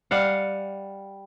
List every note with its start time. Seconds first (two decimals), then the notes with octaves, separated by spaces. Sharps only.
0.11 G3 F5 F#5